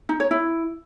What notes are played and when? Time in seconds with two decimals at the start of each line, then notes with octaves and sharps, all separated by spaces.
0.09 D#4
0.20 C#5
0.31 E4